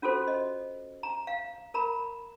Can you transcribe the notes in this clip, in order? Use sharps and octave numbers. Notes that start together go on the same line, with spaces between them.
C#4 F4 F#4 A4 C5
D#5
A#5
F5
A#4 A#5 B5